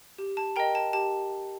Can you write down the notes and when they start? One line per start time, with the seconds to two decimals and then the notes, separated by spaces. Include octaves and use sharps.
0.18 G4
0.37 A5
0.56 A#4 D#5 G5 A#5
0.75 A5
0.93 G4 A5